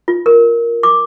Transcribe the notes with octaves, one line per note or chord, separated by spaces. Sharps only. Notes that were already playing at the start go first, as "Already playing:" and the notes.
F4
A#4
D6